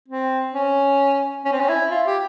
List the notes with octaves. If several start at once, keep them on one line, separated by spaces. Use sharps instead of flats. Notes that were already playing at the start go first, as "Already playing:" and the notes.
C4
C#4
C#4
C4
C#4
E4
F4
G4